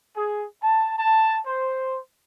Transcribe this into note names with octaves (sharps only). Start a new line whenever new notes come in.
G#4
A5
A5
C5